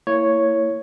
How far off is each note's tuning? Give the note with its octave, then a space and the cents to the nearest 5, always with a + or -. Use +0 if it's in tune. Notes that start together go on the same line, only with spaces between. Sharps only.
A#3 -25 E4 +0 C#5 +0